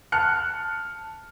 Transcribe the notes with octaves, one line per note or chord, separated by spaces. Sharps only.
A5 F6 F#6 C#7